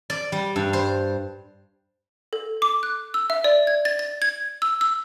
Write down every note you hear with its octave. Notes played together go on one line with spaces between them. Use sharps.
D5
G3
G2
C5
A4
D6
F#6
E6
E5
D5
G#6
A6
A6
G#6
E6
E6